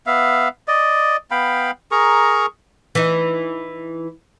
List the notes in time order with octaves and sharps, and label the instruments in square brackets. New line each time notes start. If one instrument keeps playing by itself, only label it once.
[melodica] B3 E5 F5
D5 D#5
B3 F5 G5 B5
G#4 A#4 A#5 C#6
[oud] E3 D#4